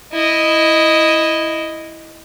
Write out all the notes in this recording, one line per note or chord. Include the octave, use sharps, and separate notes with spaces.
E4 D#5